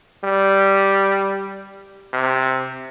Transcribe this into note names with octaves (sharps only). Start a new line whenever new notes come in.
G3
C3